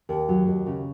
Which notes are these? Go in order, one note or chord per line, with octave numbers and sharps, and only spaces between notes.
D#2
F#3
D#2
C#3